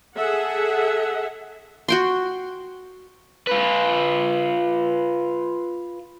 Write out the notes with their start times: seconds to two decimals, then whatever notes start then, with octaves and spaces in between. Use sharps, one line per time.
0.16 G#4 A4 E5 F#5
1.88 F#4 G5 C6
3.47 F4 B4